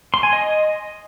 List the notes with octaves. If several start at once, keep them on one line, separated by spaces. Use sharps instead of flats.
C6
G#5
D#5